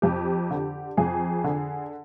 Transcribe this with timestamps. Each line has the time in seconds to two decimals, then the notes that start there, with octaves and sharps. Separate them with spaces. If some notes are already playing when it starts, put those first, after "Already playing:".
0.02 F2 G4
0.51 D3
0.97 F2 G#4
1.44 D3